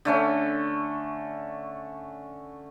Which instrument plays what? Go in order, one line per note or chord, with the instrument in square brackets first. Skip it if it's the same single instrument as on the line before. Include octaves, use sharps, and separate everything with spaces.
[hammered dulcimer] D3 A3 C#4